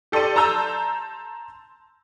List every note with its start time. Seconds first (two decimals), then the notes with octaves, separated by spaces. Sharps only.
0.12 G4 A4 D5 C6 D#7
0.36 A5 A#5 C6 E6 G6